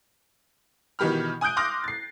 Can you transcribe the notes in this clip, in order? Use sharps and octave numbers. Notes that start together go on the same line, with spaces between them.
B2 D#3 E3 G4 B5 F6
G#5 D#6 F#6 G6 D7
C6 D6 D#6 F6 F#6 A#6
A6 C7